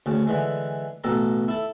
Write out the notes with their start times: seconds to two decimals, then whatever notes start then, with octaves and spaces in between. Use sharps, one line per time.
0.06 D2 C#3
0.27 D3 E3 G#3
1.04 A1 B2 A4 A#5
1.48 E4 A4